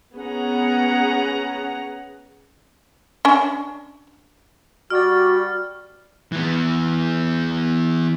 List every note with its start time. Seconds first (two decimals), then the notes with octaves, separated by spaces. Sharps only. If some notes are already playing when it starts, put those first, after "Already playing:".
0.16 B3 C#4 G#4 F#5 A#5
3.25 C#4 D4
4.90 G3 F#4 D5 F6 A6
6.32 E3 B3